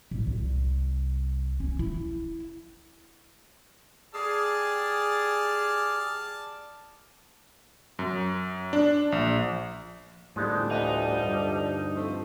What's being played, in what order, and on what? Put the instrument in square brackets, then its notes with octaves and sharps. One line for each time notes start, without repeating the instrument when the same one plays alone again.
[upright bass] A1
C2
C#4
E4
[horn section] G4 G#4 [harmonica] D5 A5 F6
[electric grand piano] F#2
D4
A#1
[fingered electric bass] A2 [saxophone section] D3 F3 G3 [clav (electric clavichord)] G#3 B3 D#4
[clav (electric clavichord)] D2 B4 [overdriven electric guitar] D#4
[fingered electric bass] G2
[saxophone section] F3 A3 C4